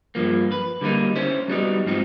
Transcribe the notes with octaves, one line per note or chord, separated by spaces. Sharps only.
G2 F3 A#3
B4
D3 G3 A#3 D#4
C#4 E4 C5
F#3 G3 B3 D#4
G#2 F3 C4 D#4